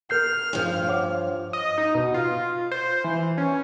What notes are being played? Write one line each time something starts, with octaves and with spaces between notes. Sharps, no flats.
A#4 F6 G6 C7
G2 F3
C#5 F#5 D6
D#5
D#4
B2
F4
C5
E3
C#4